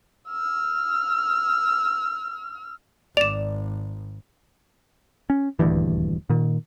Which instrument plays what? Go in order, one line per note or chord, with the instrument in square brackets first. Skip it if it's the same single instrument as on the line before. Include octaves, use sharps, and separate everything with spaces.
[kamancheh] E6 F6
[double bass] G#1 [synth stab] D5 [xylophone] E7 F7
[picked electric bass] C#4
D#1 D2 G2 E3
A#2 D#3